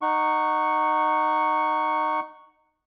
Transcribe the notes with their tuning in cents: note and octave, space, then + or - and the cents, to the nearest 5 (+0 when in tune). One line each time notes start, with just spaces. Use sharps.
D#4 -15 F#5 +0 C#6 +0